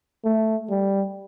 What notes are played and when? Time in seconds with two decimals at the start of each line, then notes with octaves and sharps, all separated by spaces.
0.24 A3
0.70 G3